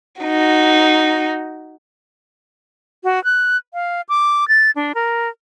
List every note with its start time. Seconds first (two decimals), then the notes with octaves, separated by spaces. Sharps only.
0.22 D#4 F#4
3.04 F#4
3.24 F#6
3.74 F5
4.09 D6
4.48 A6
4.76 D4
4.95 A#4